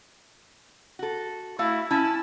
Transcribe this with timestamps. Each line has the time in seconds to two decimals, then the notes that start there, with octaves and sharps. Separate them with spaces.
0.99 F#4 A4
1.59 A3 E4 F#4 F5
1.91 C#4 E4 A5